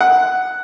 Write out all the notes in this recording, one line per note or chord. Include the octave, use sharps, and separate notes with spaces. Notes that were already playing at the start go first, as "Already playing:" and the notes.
F#5